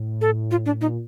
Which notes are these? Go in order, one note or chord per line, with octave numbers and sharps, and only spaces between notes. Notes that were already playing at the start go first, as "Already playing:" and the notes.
Already playing: A2
A4
F4
D4
A#2 D#4